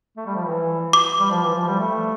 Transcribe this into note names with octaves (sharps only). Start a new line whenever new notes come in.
A3
G3
F3
E3
D6
G3
F3
E3
F3
G3
A3